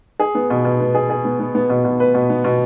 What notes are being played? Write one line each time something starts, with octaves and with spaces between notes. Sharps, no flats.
G#4
B3
B2
B2
B3
G#4
G#4
B3
B3
B3
B2
B2
B4
B2
B3
B2